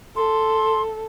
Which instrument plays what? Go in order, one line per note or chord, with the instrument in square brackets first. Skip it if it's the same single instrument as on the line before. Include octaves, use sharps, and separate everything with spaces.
[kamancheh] A4 [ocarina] C6